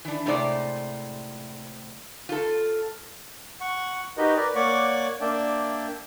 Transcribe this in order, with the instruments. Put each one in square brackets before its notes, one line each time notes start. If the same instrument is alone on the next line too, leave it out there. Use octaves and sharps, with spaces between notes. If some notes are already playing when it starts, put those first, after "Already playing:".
[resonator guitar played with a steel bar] E3 D4
A2 C3 G#3 C5 D5
F4 A4
[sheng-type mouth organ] F#5 C#6
D#4 F#4 G4 A#4 B4 D#5
A#4 B4 D5
A#3 C#5 D5 F#5 C#6 D6
A#3 D4 D5 E5 G5